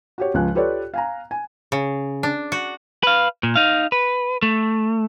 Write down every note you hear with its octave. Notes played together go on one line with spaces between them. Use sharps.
F#4 G4 C#5
C#2 F3 G#5 F#6
F4 G4 A4 B4 C#5 D5
F5 G#5 A#5
G#5
C#3
D4
F#4
B4 F5
A#2
D#4 F5
B4
A3